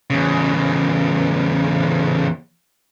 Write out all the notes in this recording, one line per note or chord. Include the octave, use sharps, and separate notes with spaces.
E2 C#3